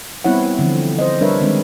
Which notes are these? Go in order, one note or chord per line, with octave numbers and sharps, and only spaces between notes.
G3 B3 C4 E4 C#5 F#5
D3 E3 F3 C4
C5 D#5
G3 D4 A#4 B4 C#5 E5
D#3 G#3 C4 D4